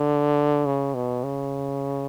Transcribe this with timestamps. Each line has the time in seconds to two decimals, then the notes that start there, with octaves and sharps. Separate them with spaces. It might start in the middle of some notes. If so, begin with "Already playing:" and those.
Already playing: D3
0.66 C#3
0.95 B2
1.24 C#3